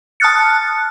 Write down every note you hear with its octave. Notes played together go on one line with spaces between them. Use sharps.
A5 D#6 F6 F#6 A6 C#7